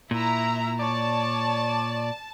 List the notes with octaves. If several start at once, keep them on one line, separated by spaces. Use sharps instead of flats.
A#2 E4 E5 A#5
C#5 D5 A5